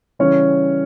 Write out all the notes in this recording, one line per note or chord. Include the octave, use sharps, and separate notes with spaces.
C#3 E3 G3 C#4 C#5